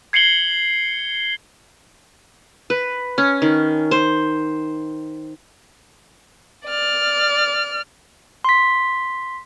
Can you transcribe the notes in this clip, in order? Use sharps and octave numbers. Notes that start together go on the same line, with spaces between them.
G#6 C7 C#7 F#7 G7
B4
C#4
D#3
C5
D5 F6
C6 B6